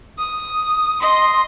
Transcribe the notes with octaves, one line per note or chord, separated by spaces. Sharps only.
D#6
D#5 C6